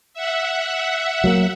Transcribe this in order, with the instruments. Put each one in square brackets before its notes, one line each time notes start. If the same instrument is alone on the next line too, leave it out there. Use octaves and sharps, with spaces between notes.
[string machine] E5 F#5
[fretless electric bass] F#3 A3 A#3